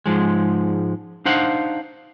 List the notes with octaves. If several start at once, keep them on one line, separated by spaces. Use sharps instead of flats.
G#2 F3 G#3
D4 D#4 C5 F5 F#5